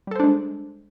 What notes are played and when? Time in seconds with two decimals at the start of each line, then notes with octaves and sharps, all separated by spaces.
0.07 G3
0.11 A4
0.16 C5
0.20 D4
0.24 G#3